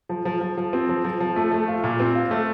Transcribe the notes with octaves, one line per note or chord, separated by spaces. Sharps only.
F3
F3
F3
F3
C4
F3
F3
F3
A3
A3
F4
A#2
C4
F4
A3